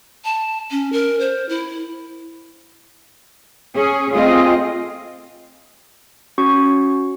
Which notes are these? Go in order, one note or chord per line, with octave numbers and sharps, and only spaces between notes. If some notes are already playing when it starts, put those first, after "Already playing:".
A5
C#4
A#4
C5
E4
C#4 G#4
A3 C4 F4 G#4 D#5
C#4 F#4 C#6